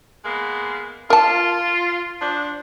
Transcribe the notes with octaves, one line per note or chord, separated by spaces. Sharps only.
G#3 A#3 B3
F4 A#4 A5
F3 D4